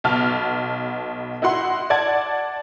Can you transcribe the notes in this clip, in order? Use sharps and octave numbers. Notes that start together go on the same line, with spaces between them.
B1 B3 A5 F6
D#4 E4 F#4 F#5 C6
D5 F#5 A5 G#6